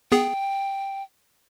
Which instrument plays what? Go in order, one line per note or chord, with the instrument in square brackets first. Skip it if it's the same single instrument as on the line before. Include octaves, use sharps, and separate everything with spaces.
[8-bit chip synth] B3 G#4 [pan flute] G5